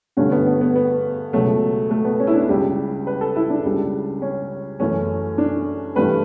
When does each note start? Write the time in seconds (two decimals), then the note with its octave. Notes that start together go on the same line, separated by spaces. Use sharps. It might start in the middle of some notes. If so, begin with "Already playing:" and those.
0.17 G2 D3 A3 C#4
0.32 B3
0.46 B3
0.61 B3
0.75 B3
1.33 C#2 B2 F#3 A3
1.91 A3
2.05 B3
2.20 C#4
2.27 E4
2.34 D4
2.49 C#2 C#3 G3 G4
3.07 B4
3.21 A4
3.36 E4
3.50 D4
3.65 C#2 C#3 G3
4.22 C#4
4.80 F#2 E3 A3 C#4
5.38 D4
5.95 G2 E3 A3 B4